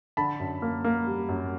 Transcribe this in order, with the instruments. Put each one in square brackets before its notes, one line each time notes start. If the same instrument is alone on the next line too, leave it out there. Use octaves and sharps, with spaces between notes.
[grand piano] D3 A5 B5
F#2
A#3
A#3
G3
F#2